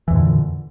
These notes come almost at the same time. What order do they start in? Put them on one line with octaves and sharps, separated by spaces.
E3 F2 A#2 D3